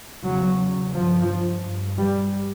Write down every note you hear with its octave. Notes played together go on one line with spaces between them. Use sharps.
E2 C#3 F#3
G2 F3
G2
G3